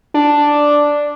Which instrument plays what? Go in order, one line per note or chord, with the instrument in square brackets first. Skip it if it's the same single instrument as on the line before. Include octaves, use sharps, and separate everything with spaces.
[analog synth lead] D4